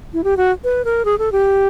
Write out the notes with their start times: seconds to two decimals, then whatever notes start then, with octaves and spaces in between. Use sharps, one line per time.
0.13 E4
0.24 G4
0.37 F#4
0.64 B4
0.85 A#4
1.05 G#4
1.19 A4
1.32 G4